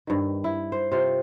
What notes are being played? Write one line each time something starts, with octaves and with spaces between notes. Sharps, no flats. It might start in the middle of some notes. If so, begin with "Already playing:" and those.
G2 D#3
E4
C5
C3 F4 C#5 F5